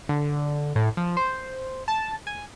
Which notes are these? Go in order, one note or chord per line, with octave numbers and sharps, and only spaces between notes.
D3
A2
F3
C5
A5
G#5